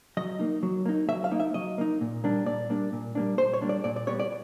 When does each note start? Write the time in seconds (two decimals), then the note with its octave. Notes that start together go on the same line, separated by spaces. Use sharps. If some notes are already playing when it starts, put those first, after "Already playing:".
0.17 F#3 D#5
0.39 A#3 D#4
0.63 F#3
0.86 A#3 D#4
1.09 F#3 E5
1.24 F5
1.31 A#3 D#4
1.40 E5
1.54 F#3 D#5
1.78 A#3 D#4
2.01 A#2
2.24 G3 A#3 D4
2.46 A#2 D5
2.70 G3 A#3 D4
2.93 A#2
3.15 G3 A#3 D4
3.38 A#2 C5
3.54 C#5
3.62 G3 A#3 D4
3.69 D5
3.84 A#2 D5
3.96 D5
4.07 G3 B3 C#5
4.20 D5